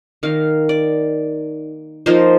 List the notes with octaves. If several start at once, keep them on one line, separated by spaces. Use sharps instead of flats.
D#3 A#3 D#4 F5
D5
F3 A#3 D#4 C5